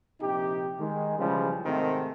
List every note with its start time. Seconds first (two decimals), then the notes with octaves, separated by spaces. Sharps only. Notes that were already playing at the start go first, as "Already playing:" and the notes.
0.20 A#1 C3 D#4 G4
0.79 D#3 G#3
1.18 B1 C#3 E3 F3 G3 G#3
1.65 G#2 C3 D#3 A3 C4